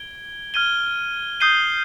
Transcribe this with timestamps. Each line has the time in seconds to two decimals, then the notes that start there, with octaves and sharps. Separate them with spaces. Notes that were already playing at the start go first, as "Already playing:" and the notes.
Already playing: G#6 D7 G7
0.54 F6 G#6 D#7 G7
1.40 D#6 G6 C7 D#7 G7